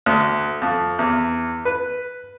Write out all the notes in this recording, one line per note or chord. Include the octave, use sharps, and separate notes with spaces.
D2
F2
E2
B4